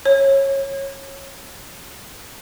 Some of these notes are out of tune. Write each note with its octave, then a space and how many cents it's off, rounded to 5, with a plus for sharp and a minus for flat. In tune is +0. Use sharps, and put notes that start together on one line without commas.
C#5 -20